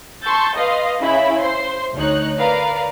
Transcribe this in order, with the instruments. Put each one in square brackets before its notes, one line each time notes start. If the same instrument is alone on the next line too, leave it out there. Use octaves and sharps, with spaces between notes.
[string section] A5 C6 C#6 E6 G6 A6
B4 D#5 F5 C6
C#3 E4 E5 B5
C5 C6
D2 D#4 C#5 F#6
A#4 B4 D5 F5 A#5